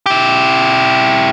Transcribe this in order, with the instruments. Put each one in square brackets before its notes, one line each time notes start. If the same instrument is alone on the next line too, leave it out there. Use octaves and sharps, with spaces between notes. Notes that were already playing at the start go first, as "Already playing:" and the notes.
[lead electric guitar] E4 G4